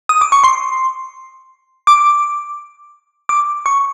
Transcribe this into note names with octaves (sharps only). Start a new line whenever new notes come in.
D#6
D6
C#6
C6
D6
D6
C#6